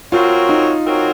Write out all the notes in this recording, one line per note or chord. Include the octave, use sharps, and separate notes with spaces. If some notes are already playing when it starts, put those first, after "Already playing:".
F#3 C4 F4 F#4 A#4
D#4
F#3 C4 F#4 A#4